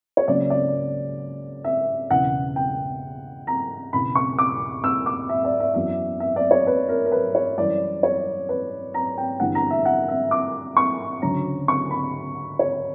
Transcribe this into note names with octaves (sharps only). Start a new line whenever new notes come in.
C#5
C#2 C#3 F#3 A#3 C#4 D5
D5
E5
E1 E2 C#3 F#5
G5
A#5
E1 E2 C#3 B5
C#6
D6
E6
D6
E5
D5
E5
F#2 E3 B3 E4 E5
E5
D5
C#5
B4
A#4
A#4
B4
C#5
F#2 E3 G3 D5
C#5
B4
A#5
G5
G1 G2 E3 G3 F#5
A#5
E5
F#5
E5
D6
C#6
D2 C#3 F#3 C#4 A#5
C#6
B5
C#5